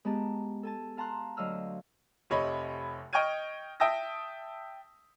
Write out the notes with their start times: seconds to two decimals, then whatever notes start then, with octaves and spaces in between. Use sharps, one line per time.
0.05 G#3 B3 G4 A5 A#5
0.63 A4 G#5 A5
0.97 F5 A5 A#5 C6 F#6
1.37 D2 F#3 D#5 F5 E6 F6
2.30 F1 C3 C#5 D#5 B5
3.13 D#5 G5 C#6 F6 G#6 D#7
3.80 E5 G5 A5 D#6 E6 A#6